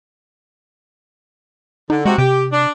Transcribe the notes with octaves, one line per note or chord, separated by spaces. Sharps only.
D3 D#4
C3 G#3 F#4
C3 G4
D4